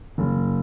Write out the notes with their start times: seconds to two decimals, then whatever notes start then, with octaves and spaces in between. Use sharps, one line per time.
0.18 F#1